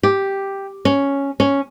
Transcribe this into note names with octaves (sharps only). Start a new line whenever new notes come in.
G4
C#4
C#4